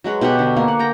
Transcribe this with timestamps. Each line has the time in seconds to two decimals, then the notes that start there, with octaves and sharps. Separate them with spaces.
0.04 F#3 G#3 B4 C#5
0.21 B2 G4 F5 F#5
0.39 D3
0.57 A#3
0.68 F#5
0.79 G5 A#5